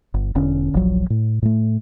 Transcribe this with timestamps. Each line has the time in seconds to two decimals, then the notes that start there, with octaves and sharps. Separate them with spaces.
0.14 G1
0.35 E1 D3 C#4
0.73 D#1 A#1 F3 F#3
1.10 A2
1.42 A2 A3